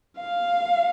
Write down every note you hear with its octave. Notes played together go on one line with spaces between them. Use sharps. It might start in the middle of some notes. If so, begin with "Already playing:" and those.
F5